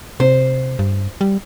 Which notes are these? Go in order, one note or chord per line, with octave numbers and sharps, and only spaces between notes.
C3 C5
G2
G3